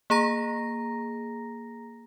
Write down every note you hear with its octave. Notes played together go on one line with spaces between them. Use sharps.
A#3 G#4 A#5 A#6